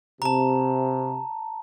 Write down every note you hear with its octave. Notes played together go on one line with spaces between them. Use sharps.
C3 A5 A#5